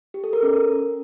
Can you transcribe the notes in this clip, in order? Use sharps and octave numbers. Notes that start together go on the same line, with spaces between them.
G4
A4
A#4
C#4